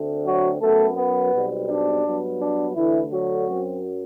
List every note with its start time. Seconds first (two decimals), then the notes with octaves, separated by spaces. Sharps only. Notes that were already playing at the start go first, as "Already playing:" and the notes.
Already playing: D2 D3 A3 C4
0.25 F#3 F#4
0.61 F#2 F#3 A3 B3 A4
0.97 B3 B4
1.32 B1 B2 G3 C4
1.68 D4
2.04 G2 F#3 B3
2.40 D4
2.76 D2 D3 E3 A3 E4
3.11 F#3 F#4
3.47 F#2 F#3 C4